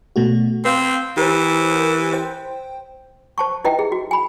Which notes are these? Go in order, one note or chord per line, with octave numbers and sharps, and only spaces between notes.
B2 A3 F#4
C4 B4 F5
E3 G4 A#4 C5
C5 G5
C5 A5 C#6
D#4 E4 B4 D#5 E5 G5
G#4
F#4
G#5 B5